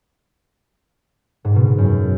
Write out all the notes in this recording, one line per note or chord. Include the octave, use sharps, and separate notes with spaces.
G#2
B2
B2
F#2